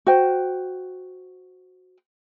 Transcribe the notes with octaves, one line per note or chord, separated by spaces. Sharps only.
F#4 C5 G5